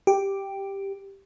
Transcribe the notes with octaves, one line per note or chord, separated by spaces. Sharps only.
G4